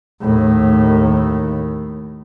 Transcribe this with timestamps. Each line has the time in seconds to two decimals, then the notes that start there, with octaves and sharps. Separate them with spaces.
0.21 D#2 A2